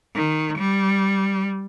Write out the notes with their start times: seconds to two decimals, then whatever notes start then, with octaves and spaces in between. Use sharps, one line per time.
0.14 D#3
0.58 G3